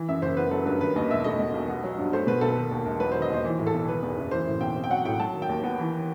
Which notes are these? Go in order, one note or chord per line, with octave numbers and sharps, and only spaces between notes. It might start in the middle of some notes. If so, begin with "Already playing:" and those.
Already playing: E3
F#2 E5
F#1 C5
B3 B4
F#3 A4
G2 B4
D#3 B4
D#2 D#5
E1 E5
A3 D#5
B2
B1
B3
F#3
G2
A3 C5
B2 B4
B1 A4
D#3
D#2
E1
F#3 B4
C5
D#3
D#5
D#2 C5
E3
A2
A4
B1
D#3 B4
E2
F#1
E3 C5
A2
B1 G5
C4
G5
F#3 F#5
A2 G5
F#3 A5
D#3
G5
D#2
B3
E3